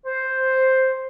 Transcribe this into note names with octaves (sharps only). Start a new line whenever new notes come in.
C5